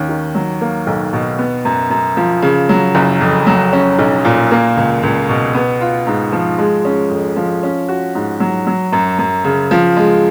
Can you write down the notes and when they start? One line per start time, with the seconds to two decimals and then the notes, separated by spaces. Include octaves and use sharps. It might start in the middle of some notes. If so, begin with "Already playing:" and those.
Already playing: D#2 C#4
0.09 D#3
0.35 F#3
0.61 A#3
0.87 B1
1.13 B2
1.39 B3
1.65 F#2
1.90 F#2
2.17 F3
2.42 C#3
2.69 F#3
2.95 F#1
3.21 F2
3.47 F#3
3.73 C#4
3.99 B1
4.25 A#2
4.51 A#3
4.77 C#2
5.03 C#2
5.29 B2
5.55 B3
5.81 F4
6.07 G#2
6.32 F3
6.58 G#3
6.85 C#4
7.10 F2
7.36 F3
7.63 C#4
7.88 F#4
8.15 G#2
8.40 F#3
8.67 F#3
8.93 F#2
9.19 F#2
9.44 C#3
9.71 F3
9.97 G#3